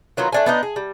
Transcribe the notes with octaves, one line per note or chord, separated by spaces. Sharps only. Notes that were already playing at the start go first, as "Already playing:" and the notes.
D#3 F#3 B3 F4
A3 D4 G#5
B3 D4 D#4
G#4
G3